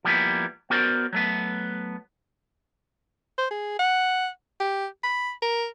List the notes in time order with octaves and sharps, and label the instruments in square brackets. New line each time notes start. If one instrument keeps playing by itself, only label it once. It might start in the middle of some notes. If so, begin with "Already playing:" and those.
[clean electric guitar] F3 G3 A#3 B3 E4
B3 F#4 A#4 C5 D5
F#3 A3 B3
[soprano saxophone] C5
G#4
F#5
G4
B5
A#4